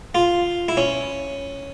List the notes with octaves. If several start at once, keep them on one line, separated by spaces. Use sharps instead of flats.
F4
E4
C#4